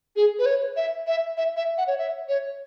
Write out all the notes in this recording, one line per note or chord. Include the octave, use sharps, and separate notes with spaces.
G#4
B4
C#5
E5
E5
E5
E5
F#5
C#5
E5
C#5